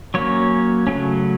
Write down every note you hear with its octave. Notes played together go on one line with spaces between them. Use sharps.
F#3 A#3 C#4 C#5
C#3 F#3 A3 C#4